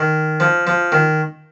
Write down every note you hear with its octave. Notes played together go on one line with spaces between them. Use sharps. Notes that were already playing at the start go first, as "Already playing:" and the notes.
Already playing: D#3
F3
F3
D#3